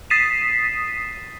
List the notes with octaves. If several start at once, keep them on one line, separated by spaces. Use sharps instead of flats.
D#6 A6 B6 C7 D#7 E7